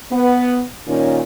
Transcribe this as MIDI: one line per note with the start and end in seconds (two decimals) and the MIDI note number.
0.11 0.62 59
0.87 1.20 46
0.87 1.20 51
0.87 1.20 61